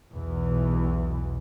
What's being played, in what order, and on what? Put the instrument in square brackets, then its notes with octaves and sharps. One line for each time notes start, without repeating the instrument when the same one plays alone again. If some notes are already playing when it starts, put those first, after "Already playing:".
[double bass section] B1 E2 B2 E3